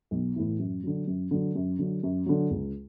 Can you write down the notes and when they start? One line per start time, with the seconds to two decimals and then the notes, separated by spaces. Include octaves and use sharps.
0.11 B1
0.36 A2 E3
0.59 F#2
0.83 D3 F#3
1.07 F#2
1.31 D3 F#3
1.55 F#2
1.79 D3 F#3
2.03 F#2
2.26 D3 F#3
2.50 C#2